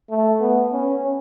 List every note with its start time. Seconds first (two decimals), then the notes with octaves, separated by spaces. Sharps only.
0.10 A3
0.41 B3
0.73 C#4